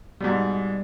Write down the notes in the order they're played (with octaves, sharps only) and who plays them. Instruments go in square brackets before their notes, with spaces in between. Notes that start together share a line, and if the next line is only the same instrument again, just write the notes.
[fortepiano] G#2 B2 [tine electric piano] G3 D5